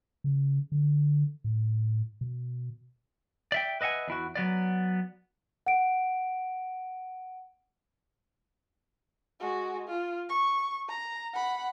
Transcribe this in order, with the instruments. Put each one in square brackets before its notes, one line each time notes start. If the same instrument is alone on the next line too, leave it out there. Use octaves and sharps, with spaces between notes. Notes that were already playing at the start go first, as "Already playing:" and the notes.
[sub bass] C#3
D3
A2
B2
[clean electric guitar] D5 E5 G5
B4 D#5 E5 F#5 G#5
E2 E4 F#4
F#3 B3 D5
[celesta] F#5 D7
[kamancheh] G#3 F#4
F4
C#6
A#5
F#5 B5